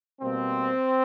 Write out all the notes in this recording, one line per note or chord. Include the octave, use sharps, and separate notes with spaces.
B2 G3 A#3 C4